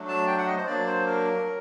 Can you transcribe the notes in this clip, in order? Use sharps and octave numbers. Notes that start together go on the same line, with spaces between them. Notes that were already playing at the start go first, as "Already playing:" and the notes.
Already playing: F#3 A3 D4
A5
G5
F#5
D#5
C5
F#3 A#3 D4 D5
C5
A#4
F#3